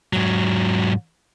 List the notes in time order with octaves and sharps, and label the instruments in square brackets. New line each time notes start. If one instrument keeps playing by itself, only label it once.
[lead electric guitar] G#2 F#3